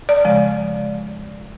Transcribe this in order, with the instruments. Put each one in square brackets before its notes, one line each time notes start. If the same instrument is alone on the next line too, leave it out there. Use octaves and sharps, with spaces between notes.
[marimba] D5
C#3 F3 G#3